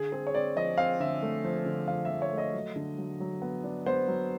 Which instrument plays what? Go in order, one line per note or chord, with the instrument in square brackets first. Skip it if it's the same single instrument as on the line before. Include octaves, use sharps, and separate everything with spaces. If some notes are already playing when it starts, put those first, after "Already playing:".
Already playing: [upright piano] D3 G#4
C4 G#4
C#5
C4 D5
F3 D#5
C4 F5
D3 E5
A3
F3
D3
F3 F5
E5
F3
C#5
A3
D#5
F#3
D3
F#3
F#3
B3
D4
B3 C5
F#3